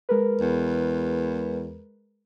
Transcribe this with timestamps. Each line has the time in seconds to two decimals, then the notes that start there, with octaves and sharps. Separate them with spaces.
0.09 G#3 A#4 B4
0.41 E2